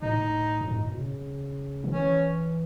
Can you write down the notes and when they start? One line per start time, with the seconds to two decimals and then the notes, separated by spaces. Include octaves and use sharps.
0.02 A2 D#4
0.61 F#2
0.70 G#2
0.80 A2
0.88 B2
0.98 C#3
1.84 D#3
1.93 E3 C#4